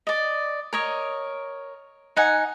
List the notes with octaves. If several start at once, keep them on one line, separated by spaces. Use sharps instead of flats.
D5 D#5
A#4 C#5 D#5
D#4 F#5 G#5